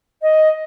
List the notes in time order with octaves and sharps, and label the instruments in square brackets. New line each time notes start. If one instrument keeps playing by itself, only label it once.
[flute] D#5